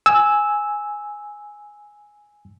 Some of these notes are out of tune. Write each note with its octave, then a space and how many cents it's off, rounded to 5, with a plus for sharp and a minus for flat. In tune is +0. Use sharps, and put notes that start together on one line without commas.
G#5 +0 E6 -10